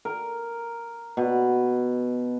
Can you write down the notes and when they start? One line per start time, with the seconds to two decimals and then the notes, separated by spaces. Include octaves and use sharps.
0.05 A#4
1.17 B2